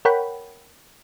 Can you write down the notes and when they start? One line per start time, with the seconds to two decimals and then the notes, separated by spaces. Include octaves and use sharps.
0.05 A#4 C#5 F#5 G5 B5